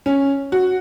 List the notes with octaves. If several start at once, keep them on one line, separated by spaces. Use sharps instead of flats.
C#4
F#4